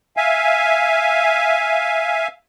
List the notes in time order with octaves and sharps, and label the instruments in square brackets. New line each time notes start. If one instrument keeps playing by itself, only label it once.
[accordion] E5 F5 G#5